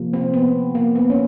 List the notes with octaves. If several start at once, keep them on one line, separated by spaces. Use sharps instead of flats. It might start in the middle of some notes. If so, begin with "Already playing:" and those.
Already playing: C3 F3 A#3
C4
B3
A#3
B3
C#4